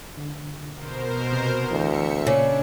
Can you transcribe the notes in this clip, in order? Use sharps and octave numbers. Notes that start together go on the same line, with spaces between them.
D3
B2 A#4 C5
C3
D2 E3 E5 C#7
A#2 C#3 D4 D5